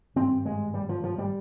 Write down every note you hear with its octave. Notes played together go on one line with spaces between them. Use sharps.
G#1 G2 C4
G#3
G3
F3
F3
G3